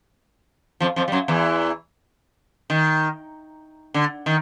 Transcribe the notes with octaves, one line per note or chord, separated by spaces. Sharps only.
F2 F3
F2 F3
G3
F#2 F#3
E2 E3
D#3
D3
D#3